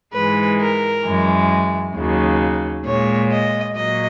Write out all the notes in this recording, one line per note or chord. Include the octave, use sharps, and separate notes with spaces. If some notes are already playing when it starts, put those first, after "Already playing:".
G#2 E3 G#3 B4
A#4
F#2 E3 G#3
D#2 C#3 F#3
A#2 G#3 C#5
D#5
A#2 F#3 D#5